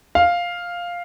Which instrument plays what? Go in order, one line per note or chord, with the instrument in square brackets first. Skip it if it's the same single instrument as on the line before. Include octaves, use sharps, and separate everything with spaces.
[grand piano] F5